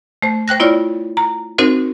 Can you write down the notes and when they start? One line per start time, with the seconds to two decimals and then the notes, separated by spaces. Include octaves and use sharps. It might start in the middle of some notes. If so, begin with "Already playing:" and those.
0.22 A3 C5
0.48 C5 G5 F#6 A#6
0.60 B3 E4 F4 C#5 D5
1.17 A#5
1.58 C4 D#4 F#4 A#4 C5